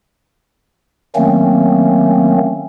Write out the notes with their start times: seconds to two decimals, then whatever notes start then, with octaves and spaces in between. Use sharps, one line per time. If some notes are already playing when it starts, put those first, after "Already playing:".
1.15 D#3 F#3 A3 A#3 C4 C#4